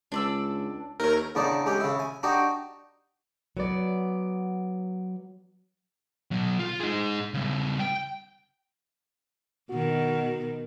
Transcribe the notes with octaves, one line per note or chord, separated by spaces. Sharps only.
C#2 D4 D5 E6
D#2 A3 A#4 C#5
E2 C#3 D4 D#4 D5
G#3 C#4 G4
C#3 E4
G#5
D4 D#4 F#4 G4
F#3 B3 D5
B2 F#3
F4
D#4 G#4
C#3 G3
G5
B2 D#3 F#4